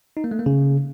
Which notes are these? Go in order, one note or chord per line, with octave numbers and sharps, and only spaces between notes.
D#4
A#3
A3
A#3
C#3